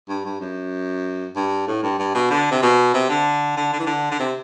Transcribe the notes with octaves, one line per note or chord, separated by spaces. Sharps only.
G2
G2
F#2
G2
A2
G2
G2
B2
D3
C3
B2
C3
D3
D3
D3
E3
D3
D3
C3